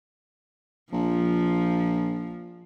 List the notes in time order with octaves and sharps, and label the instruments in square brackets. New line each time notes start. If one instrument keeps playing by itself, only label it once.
[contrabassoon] A#1 [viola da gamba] F3